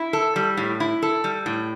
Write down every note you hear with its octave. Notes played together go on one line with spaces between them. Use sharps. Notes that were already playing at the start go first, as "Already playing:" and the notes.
Already playing: E4
A4
G3
A2
E4
A4
G3
A2